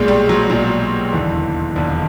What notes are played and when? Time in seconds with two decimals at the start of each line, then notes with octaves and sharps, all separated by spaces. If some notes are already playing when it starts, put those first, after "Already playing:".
Already playing: B1 A#2 G#3
0.08 G3
0.29 F#3
0.50 B1 A#2 F#3
1.12 E1 D#2 D3 E3
1.75 E1 D#2 D3